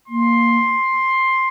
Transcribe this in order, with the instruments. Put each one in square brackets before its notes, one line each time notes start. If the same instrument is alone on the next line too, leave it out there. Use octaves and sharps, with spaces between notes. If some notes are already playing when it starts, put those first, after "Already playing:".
[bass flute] A#3 [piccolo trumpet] C6